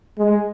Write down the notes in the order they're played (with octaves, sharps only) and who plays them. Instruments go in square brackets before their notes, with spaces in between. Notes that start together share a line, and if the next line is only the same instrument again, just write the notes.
[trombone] G#3